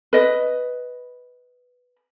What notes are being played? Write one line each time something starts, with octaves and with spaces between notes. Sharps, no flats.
B4 D#5